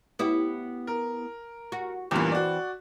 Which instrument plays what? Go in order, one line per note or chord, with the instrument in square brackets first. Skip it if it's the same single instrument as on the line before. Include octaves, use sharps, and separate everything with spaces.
[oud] B3 E4 G4
[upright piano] A#4
[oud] F#4
[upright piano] E2 G2 A#2 [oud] E3 C4
[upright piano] F#4 D5